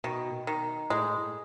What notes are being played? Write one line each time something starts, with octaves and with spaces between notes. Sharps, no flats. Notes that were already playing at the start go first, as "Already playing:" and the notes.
B2 D#3
D#3
A2 G#3